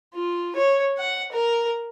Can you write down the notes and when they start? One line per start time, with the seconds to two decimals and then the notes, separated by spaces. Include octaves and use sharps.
0.14 F4
0.56 C#5
0.98 F#5
1.32 A#4